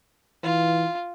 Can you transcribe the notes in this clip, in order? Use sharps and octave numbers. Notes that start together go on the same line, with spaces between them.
E3 F4